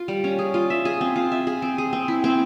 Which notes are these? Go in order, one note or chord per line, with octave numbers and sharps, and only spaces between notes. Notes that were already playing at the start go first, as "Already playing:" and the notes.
Already playing: F4
G3
C#4
G#4
F4
E5
G#4
C4
F4
E5
G#4
C4
G#4
C4
E4
C4